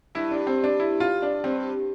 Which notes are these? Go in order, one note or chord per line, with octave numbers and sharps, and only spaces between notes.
G2 E4
D4
C4
D4
E4
F4
D4
G2 C4